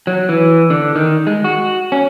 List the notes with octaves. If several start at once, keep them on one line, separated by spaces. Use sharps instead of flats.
F#3
E3
D3
D#3
G#3
F#4
C#4